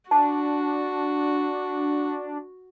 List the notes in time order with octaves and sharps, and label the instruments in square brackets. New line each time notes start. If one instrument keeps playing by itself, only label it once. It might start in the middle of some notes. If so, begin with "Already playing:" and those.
[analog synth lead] D4 [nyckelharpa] F#4 [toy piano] A5